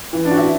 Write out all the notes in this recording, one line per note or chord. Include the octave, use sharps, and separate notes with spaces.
E3
D4
F#4
E4